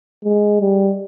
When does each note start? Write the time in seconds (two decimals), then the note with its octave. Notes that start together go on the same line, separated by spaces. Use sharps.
0.24 G#3
0.61 G3